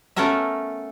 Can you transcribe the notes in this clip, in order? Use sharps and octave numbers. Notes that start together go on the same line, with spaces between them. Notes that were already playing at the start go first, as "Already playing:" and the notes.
A3 B3 C#4 A4 A#4 E5